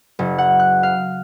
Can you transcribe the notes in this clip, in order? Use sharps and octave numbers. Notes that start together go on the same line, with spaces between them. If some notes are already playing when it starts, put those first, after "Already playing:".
F#1
F#5
F#6
F5